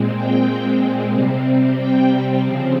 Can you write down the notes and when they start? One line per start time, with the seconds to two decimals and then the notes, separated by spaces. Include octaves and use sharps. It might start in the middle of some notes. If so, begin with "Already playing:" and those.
Already playing: A#2 G#3 C4
0.14 G5
1.11 C3 G3 C4
1.77 G5
2.41 C#3 F3 C4